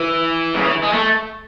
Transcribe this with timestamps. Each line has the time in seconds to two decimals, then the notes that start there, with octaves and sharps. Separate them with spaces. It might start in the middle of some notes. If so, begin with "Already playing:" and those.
Already playing: E3
0.55 C#3
0.64 E3
0.83 G#3
0.93 A3